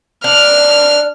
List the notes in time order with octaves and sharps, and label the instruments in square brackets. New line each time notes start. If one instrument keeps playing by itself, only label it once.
[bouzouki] D4 [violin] F6